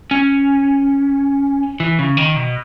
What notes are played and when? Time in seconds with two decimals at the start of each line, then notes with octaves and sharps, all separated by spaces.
0.11 C#4
1.80 E3
1.99 C#3
2.17 D#3
2.36 B2